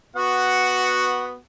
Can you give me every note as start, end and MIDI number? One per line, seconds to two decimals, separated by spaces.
0.16 1.36 59
0.16 1.36 66
0.16 1.36 78